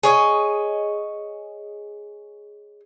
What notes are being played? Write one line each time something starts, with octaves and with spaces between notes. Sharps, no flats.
G#4 C#5 D#5